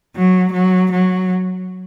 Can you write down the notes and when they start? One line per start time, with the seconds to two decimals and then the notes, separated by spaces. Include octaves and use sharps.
0.16 F#3
0.53 F#3
0.91 F#3